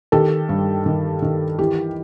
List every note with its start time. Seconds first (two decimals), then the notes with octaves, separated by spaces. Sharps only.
0.12 D#3 G4 A4
0.49 G2
0.86 D#3
1.22 D#3
1.59 E3 G4